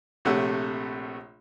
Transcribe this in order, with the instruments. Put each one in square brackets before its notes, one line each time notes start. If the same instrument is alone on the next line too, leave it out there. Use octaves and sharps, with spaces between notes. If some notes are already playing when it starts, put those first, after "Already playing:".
[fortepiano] A#1 C3 A3 C#5 F#5 E6